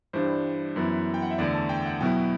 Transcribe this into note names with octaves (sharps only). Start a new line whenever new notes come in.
G2 E3 G3 D4 C5
F#2 E3 B3 E4
G5
F#5
E5
E2 D3 A3 D5
A5
G5
F#5
B2 F#3 B3 E4 G5